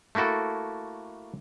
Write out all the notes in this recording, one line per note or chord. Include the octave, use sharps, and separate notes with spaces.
A3 A#3 E4 F#4 A4